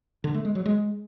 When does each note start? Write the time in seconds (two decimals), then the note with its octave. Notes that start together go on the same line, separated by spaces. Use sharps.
0.24 D3
0.34 A3
0.45 G#3
0.55 F#3
0.66 G#3